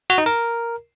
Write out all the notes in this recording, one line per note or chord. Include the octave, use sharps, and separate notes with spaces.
F#4
D#4
A#4